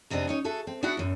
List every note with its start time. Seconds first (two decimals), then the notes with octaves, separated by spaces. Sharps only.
0.10 F2 C3 B3 C4 D4 D#5
0.27 C#4 D#4 C#5
0.44 F#4 G#4 A4 E5
0.67 C4
0.83 B3 D4 E4 F#4 F#5
0.97 F#2 A2